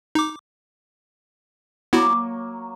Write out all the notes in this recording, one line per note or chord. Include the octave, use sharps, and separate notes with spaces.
D#4 D6
F#3 A#3 B3 E4 F#4